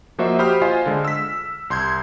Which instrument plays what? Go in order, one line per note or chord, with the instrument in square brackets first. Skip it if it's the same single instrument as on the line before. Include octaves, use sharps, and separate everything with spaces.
[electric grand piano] F3 A#3 F#4 C5 D#5 E5
F#4 G4 C5 B5 D#6 F6
F4 C5 D#5 F5 G#5
D3 G#3
E6 B6
C2 C6 G6 G#6